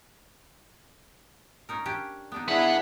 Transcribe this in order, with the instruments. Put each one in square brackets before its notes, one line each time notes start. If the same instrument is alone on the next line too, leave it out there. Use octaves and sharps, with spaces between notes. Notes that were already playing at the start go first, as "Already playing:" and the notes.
[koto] C#4 D#4 A#4
C#4 D4 G4
B3 D4 D#4
[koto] C#3 [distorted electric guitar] B3 F#5 [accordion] D4 E4 G#4